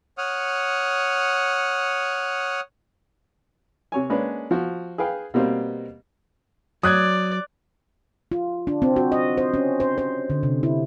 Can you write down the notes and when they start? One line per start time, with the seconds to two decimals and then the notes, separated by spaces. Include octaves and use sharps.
0.18 C#5 F#5 D#6 F6
3.92 C3 C#5 G#5
4.10 G#3 A#3 C#4 D4 B4
4.51 F3 F#4
4.98 G#4 B4 F5 G5
5.34 B2 G3 A#3 C4
6.83 F#3 D5 D#6 F#6 G#6
8.32 F4
8.67 D4
8.82 C4
8.96 F#4
9.12 D#5
9.37 C5
9.54 C#4
9.80 C5
9.98 C5
10.30 D3
10.43 C3
10.63 E4